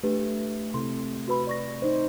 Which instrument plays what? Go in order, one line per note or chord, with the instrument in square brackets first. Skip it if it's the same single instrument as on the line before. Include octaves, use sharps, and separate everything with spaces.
[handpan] A3 [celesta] D4 G4 B4
[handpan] C3 E4 A4 [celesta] C6
[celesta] F#4 B4 B5
D5 C#6 A#6
[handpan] D#4 C5